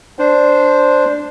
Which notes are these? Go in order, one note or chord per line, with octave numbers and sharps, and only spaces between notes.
D4 C5